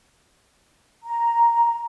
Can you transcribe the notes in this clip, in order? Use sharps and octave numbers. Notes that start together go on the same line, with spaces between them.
A#5